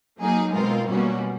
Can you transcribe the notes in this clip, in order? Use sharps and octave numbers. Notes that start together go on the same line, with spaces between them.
F#3 A#3 D#4 G#4
B2 G#3 C4 F4 A#4
B2 G3 A#3 C#4 F#4